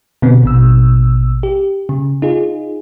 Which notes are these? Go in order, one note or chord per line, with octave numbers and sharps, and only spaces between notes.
B2 D3 B3 C4
A1 B2 E6
G4
C#3
D#4 F4 G#4